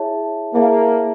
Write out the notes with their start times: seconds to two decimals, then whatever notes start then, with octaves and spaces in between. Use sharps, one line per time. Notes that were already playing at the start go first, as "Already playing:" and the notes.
Already playing: E4 G#4 C#5 E5 A5
0.54 A#3 E4 G#4 C#5 E5 A5